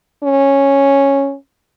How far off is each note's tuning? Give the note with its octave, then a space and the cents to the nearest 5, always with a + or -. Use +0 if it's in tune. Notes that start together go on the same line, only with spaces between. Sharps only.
C#4 -5